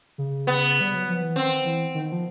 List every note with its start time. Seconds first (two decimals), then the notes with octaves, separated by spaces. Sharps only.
0.18 C#3
0.47 B3
0.81 G3
0.95 F#3
1.09 F3
1.22 E3
1.36 D#3 C4
1.65 E3
1.94 D#3
2.12 F3